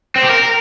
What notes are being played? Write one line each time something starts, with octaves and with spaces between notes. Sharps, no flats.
C4
G4
A#4